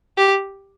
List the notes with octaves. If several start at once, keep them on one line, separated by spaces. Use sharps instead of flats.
G4